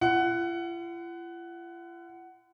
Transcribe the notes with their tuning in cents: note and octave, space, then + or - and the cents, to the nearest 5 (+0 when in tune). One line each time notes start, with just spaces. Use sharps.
F4 -45 F#5 +15